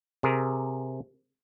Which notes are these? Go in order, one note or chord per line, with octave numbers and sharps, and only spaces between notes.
C3 G#4 A#4